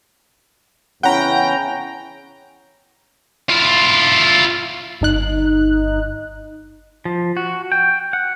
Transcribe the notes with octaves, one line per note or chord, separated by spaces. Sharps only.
E2 C#3 C#4 E4 F#5 G5 A#5 B5
E4 F4
G1 D#4 F#6
F3
F#4
G5
F#5